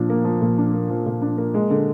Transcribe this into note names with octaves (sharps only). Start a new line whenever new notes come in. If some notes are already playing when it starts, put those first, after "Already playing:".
Already playing: A#2 F3 D4
A#3
F3
A#2
D4
A#3
F3
A#2
D4
A#3
G#3
D3